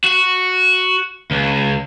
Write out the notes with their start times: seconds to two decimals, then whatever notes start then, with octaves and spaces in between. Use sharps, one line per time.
0.04 F#4
1.31 C#2